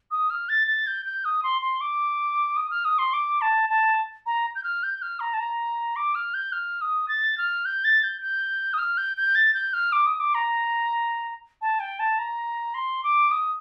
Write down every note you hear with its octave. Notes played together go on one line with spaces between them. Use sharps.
D#6
F6
A6
A6
G6
G6
D#6
C6
C6
D6
D#6
F6
D#6
C6
D6
A5
A5
A#5
G6
F6
G6
F6
A#5
A5
A#5
D6
F6
G6
F6
D#6
A6
F6
G6
A6
G6
G6
D#6
F6
G6
G6
A6
G6
F6
D6
D#6
D6
A#5
A5
G5
A5
A#5
C6
D6
D#6